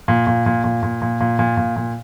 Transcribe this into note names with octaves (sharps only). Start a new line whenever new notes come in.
A#2
A#2
A#2
A#2
A#2
A#2
A#2
A#2
A#2
A#2